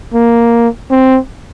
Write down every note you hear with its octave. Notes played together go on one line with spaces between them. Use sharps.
A#3
C4